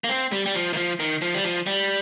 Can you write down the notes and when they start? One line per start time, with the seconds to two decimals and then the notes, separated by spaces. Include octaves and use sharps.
0.04 A#3
0.09 C4
0.32 G3
0.46 G3
0.55 F3
0.73 D#3
0.77 F3
1.00 D#3
1.22 F3
1.34 G3
1.44 F3
1.67 G3